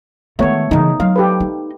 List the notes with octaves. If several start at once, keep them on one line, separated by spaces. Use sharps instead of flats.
D#3 G#3 A3 B3 C#5
C#3 E3 D#4
F#3 F5
G4 A4 B4
D#4